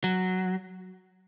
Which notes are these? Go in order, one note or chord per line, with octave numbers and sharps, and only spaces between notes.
F#3